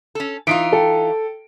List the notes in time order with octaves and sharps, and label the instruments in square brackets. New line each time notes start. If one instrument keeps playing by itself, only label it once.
[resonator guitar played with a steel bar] C#4 A4
[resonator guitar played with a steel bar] E3 D#4 F4 [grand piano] D#6 D7
[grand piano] A4 G5